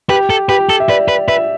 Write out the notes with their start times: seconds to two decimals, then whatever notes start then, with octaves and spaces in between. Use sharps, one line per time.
0.09 G4 B4
0.30 A4
0.49 G4 B4
0.69 A4
0.80 E5
0.89 B4 D5
1.08 B4
1.28 B4 E5